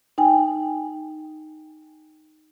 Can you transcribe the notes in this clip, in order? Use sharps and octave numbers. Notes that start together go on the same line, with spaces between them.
D#4 G5 G#5